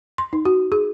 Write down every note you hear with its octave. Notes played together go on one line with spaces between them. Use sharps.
C6
D#4
F#4
G#4